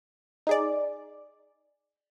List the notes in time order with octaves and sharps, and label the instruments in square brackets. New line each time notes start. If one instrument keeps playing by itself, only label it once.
[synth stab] D#4 G#4 D5